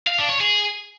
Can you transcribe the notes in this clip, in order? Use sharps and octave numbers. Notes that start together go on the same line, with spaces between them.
F5
D4
C#5
G#4